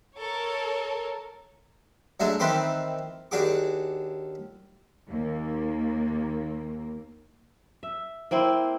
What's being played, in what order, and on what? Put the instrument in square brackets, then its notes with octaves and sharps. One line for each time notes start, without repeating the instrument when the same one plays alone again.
[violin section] A4 A#4 C#5
[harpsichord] F#3 G#3 A3 D4 G#5
D#3 E3 C4 B4 C6 D6
D#2 D4 F#4 G#4 D6
[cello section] D#2 A#3
[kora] E5
A#3 C4 E4 C5